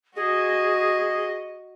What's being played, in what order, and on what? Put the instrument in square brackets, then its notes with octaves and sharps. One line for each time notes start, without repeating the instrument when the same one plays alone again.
[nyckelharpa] F#4 D#5 [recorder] G#4